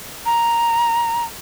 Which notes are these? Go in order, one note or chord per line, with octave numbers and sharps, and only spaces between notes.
A#5